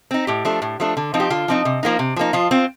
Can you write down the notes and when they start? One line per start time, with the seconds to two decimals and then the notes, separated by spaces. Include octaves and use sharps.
0.11 C4 D#4
0.27 A2 G4
0.45 F3 A3 D4
0.62 A2
0.80 F3 A3 D4
0.97 D3
1.14 F3 C4 D#4
1.20 G4
1.30 D3 F4
1.48 F3 C4 D#4
1.65 C3
1.83 F3 A#3 D#4
1.99 C3
2.16 F3 A#3 D#4
2.33 F3 F4
2.51 C4 F4